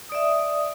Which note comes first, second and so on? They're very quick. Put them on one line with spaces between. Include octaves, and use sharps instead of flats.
D#6 D5 E5